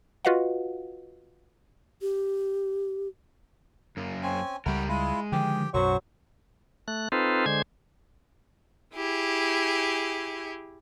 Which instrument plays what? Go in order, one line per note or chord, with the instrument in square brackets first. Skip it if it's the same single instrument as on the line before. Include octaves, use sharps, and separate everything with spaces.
[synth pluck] F4 F#4 B4 D#5 F5 F#5
[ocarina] G4
[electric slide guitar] F#2 A#3
[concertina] C4 C#4 G#5
[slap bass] C#2 G3 [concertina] A3 F#5 B5 [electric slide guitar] G4 A#4
[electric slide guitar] G#3 [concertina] E4 F4
[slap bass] D3 D#3 F3 [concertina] G4 G5
[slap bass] B1 F#2 [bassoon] F#3 [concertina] F#4 C5 C#6
[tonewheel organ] A3 F#6
C4 D#4 F4 A4 B4 C5
D3 G#3 C5 G#6
[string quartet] E4 G4 G#4